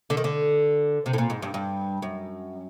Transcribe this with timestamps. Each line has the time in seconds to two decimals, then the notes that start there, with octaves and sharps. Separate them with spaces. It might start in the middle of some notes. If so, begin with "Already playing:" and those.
0.10 D3
0.17 D#3
0.24 D3
1.06 C3
1.13 A2
1.18 A#2
1.30 G#2
1.42 G2
1.54 G2
2.02 F#2